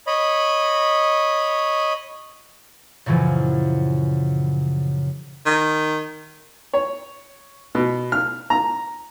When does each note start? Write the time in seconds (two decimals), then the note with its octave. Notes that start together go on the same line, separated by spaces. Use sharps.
0.07 C#5 D#5 B5
3.06 F#2 A#2 C#3 E3 F3
5.46 D#3
6.73 C#5
7.75 B2
8.12 F6
8.50 A#5